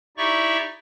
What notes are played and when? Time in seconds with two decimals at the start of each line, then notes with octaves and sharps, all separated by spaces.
0.17 D#4 E4 G4 D5 E5 C#6